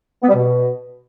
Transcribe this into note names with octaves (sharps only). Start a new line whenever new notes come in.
B3
G3
B2